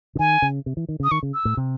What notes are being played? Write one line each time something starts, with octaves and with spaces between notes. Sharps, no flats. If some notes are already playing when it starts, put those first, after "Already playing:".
C#3
D#3 G#5
C#3
C3
E3
D#3
C#3
D#6
D#3 C#6
C#3
E6
A2
C3